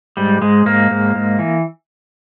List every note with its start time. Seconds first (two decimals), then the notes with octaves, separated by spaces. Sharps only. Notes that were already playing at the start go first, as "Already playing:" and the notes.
0.17 G#2 G3
0.42 G#2 G#3
0.66 G#2 A#3
0.91 G#2
1.15 G#2
1.39 E3